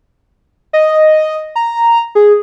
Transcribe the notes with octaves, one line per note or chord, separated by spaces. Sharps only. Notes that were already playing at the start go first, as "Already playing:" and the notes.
D#5
A#5
G#4